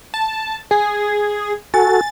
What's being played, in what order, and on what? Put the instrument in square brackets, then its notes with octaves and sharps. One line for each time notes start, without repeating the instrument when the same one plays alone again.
[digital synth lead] A5
[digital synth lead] G#4 [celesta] G#5
[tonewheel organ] F#4 A4 [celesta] G#5 [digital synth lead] A6